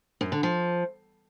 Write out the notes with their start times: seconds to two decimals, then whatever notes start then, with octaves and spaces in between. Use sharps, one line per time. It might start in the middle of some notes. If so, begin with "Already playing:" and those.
0.21 F#2
0.32 D3
0.43 F3